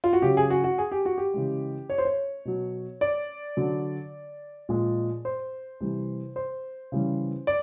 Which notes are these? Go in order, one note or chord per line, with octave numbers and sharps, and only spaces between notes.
F4
F#4
C#3 F#3 G4
G#4
F#4
F#4
G#4
G4
F#4
G4
C#3 E3 G#3
C#5
C5
C#5
B2 F#3
D5
D3 F#3
A#2 F3 G#3
C5
C3 E3 G3
C5
C#3 E3 G3
D5